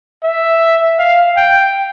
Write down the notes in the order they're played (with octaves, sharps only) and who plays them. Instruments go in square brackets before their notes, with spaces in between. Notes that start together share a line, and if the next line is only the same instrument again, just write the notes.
[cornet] E5
F5
G5